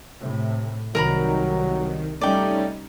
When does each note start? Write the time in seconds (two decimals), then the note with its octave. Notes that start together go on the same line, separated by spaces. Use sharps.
0.19 A2 C3
0.95 C2 D#3 F#3 A#4 A#5 B5
2.21 G3 A3 C#4 D#4 D5 G5